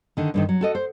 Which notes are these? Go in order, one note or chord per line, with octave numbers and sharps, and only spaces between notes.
D3 D#3
G2 D3 D#3
F#3
F#4 A4 D#5
C5